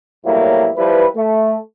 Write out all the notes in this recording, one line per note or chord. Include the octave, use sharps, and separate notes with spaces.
E2 A2 F#3 G3 A#3 E4
F3 G3 E4 B4
A3